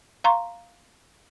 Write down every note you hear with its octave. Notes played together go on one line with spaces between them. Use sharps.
F5 A#5 C6 C#6